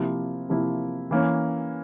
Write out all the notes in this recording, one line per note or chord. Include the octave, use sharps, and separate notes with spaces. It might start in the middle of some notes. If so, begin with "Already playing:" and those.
Already playing: C3 F3 A#3 E4
C3 F3 A#3 E4
E3 A#3 C#4